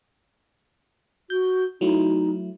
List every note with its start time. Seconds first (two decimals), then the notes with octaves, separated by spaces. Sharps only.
1.30 F#4 G6
1.81 F#3 A3 D#4 E4